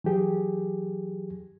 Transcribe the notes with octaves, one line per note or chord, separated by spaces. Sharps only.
E3 F#3 G4 G#4